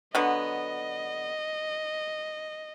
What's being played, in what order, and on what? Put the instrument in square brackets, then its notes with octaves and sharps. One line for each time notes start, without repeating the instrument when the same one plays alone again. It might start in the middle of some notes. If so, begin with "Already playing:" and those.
[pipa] D3 F#3 B3 [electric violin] D#5